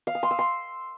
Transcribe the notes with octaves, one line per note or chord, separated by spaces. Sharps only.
F5
D#6
C6
E6
C6